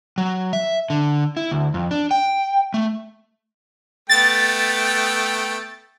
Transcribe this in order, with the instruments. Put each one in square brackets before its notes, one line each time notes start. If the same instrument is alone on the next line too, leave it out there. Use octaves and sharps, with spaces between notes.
[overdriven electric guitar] F#3
E5
D3
E4
D2
F2
D4
G5
A3
[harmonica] A3 B3 G5 [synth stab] A6